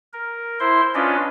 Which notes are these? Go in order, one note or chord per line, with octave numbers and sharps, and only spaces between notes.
A#4
E4 C5 C6
C#4 D4 F4 B4 D5 D#5